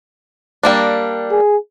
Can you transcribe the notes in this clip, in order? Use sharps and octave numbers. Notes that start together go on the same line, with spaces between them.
G3 A#3 D4
G#4